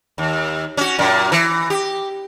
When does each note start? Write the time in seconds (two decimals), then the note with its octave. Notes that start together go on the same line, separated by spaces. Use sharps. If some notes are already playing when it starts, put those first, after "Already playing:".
0.18 D#2
0.77 C#4 F#4
0.99 F#2 A#2
1.32 E3
1.70 G4